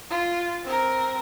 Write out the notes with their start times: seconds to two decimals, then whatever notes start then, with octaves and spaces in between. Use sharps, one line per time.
0.10 F4
0.64 C4 A#4